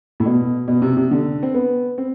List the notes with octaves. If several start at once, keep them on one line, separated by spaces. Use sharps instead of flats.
A2
B2
B2
C3
C3
D3
C4
B3
C4